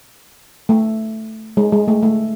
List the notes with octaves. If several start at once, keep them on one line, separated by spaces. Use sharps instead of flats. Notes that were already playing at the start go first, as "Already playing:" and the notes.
A3
G#3
G#3
A3
A3